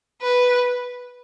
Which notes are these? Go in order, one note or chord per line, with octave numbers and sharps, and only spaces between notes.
B4